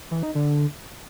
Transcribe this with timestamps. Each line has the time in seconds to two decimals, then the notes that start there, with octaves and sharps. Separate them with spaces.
0.11 E3
0.23 D#4
0.35 D3